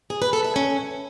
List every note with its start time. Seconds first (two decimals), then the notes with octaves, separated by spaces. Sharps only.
0.10 G#4
0.22 B4
0.33 A4
0.44 E5
0.56 C#4